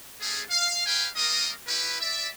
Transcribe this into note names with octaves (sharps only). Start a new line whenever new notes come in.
G3 A3 C#4 G#4
F5
G4 B4 F5 G5 G#5
G3 A#3 A#4 D#5 D#6
C#4 E4 G4 B4
D5 E5